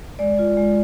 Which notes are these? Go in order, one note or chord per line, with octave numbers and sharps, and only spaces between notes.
G#3 D5
F4
G#3